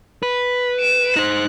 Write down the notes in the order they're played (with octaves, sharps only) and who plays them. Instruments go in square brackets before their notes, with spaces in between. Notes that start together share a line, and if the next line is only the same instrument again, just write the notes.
[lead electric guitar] B4
[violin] D7 E7
[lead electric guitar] D#4 C5 [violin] F#6